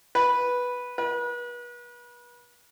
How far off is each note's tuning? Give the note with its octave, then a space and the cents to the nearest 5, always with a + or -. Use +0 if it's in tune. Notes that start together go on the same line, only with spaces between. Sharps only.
B4 -5
B4 -35